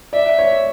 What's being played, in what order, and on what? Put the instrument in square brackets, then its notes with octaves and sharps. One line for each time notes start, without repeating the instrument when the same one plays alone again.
[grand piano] D5 [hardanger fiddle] E5
[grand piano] C#5